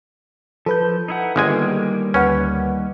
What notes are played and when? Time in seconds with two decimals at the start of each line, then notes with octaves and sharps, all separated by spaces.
0.66 F3 A4 B4 G6
1.08 D#4 E4 F#5
1.36 G1 D#3 G3 G#3 A#3 G#5
2.14 D2 C#4 B4 F#5